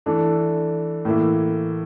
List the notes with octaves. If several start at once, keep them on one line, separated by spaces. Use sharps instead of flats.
E3 A3 D4 A4
A2 E3 A#3 E4